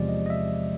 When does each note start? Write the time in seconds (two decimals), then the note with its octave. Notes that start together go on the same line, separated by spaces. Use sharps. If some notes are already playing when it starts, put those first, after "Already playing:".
Already playing: E2 C3 F3 G#3 D5
0.09 D#5
0.26 D#5
0.30 E5